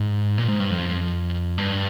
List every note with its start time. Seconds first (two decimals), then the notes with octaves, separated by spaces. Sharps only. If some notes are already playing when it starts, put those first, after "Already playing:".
Already playing: G#2
0.38 A#2
0.48 G#2
0.60 G2
0.71 F2
1.58 G2